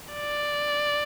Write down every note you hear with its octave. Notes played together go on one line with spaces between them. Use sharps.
D5